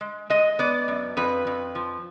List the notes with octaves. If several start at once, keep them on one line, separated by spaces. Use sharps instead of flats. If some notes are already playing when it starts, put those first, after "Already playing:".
G#3
G#3 D#5
B3 D5
F#2
F2 B4
F2
F3